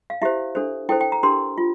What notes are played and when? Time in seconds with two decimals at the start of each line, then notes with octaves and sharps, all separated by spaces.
0.10 F5
0.22 E4 G4 C5 E5
0.55 D4 A4 C5
0.89 E4 A4 C5 G5
1.01 G5
1.12 A#5
1.23 D4 G4 A#4 C6
1.58 F4